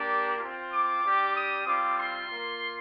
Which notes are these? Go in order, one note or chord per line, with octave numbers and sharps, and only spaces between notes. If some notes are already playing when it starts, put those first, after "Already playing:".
Already playing: A#3 D4 G4
C4 F4
D6
G3 D4 G4
D#6
G3 C4 F4 D6
C6
A#3 F4